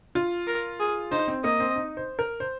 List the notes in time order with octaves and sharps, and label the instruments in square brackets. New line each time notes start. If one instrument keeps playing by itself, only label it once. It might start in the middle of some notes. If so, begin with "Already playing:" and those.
[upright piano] F4
[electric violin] A#4
G#4
[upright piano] D#4 [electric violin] C5
[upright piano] C4
[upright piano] A#3 [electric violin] D#5
[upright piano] C4
D#4
C5
A#4
C5